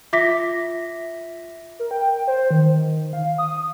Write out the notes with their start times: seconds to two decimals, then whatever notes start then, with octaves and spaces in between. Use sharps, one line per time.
0.13 F4 E5 D6 A#6 B6
1.79 A#4
1.91 G5
2.28 C5
2.51 D#3
3.13 F5
3.38 D#6